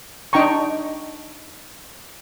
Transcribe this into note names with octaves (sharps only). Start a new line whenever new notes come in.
D4 D#4 G5 A#5 C#6